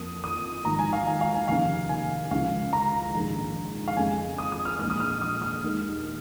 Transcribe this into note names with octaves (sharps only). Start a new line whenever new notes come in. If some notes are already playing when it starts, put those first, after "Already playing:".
Already playing: F2 F3 A#3 D#6
D#6
G#1 G#2 F3 A#5
G#5
F5
G#5
F5
G#5
F1 D#2 C#3 F5
G#5
C#2 C#3 F3 F5
A#5
A#1 G#2 D#3 G#3
F5
F2 C#3 G#3 G#5
D#6
D#6
F6
A#1 A#2 G#3 F6
D#6
F6
D#6
F6
D#2 D#3 G#3